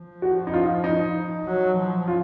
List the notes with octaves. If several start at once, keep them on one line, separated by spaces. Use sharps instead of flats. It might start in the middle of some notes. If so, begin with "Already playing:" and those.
Already playing: F3
F#4
D#4
F4
D#4
F#3
F3
F4